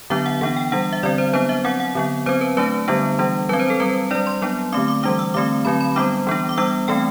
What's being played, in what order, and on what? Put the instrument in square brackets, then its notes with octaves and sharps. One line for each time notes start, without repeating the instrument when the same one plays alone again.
[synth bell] D3 F#3 B3 D4 E5
F#5
E3 B3 D4 F#5
G5
E3 G3 D4 F#5
E5
D3 G3 C4 D5
C5
F#3 B3 D4 C5
E5
F#3 C4 F#5
F#5
D3 F#3 B3
F#3 C4 C5
B4
F#3 A3 D4 B4
D3 G3 B3 D4
E3 G3 D4
F#3 B4
C4
C5
A4
G3 C4 B4
D4 D5
G3
C6
F#3 B3 D4
D3 A3 C4 D6
D6
E3 G3 D4 D6
E6
D3 A3 C4 D6
D3 F#3 C4 B5
B5
G3 B3 D4 D6
E3 B3 D4
D6
G3 B3 D4 E6
E3 A3 C4 G5